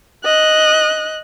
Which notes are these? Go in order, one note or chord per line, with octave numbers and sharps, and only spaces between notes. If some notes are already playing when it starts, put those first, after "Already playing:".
D#5 F#6